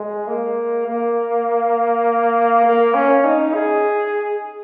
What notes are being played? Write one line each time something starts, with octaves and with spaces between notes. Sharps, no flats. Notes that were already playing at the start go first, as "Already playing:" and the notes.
Already playing: G#3
A#3
A#3
A#3
C#4
D#4
G#4